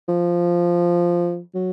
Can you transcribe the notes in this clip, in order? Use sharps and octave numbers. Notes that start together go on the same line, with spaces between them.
F3
F#3